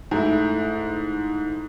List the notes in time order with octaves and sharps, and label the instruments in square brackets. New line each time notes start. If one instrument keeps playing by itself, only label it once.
[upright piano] G#2 A3 E4